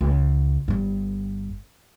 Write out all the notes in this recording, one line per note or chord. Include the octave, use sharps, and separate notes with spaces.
C#2
G1 G2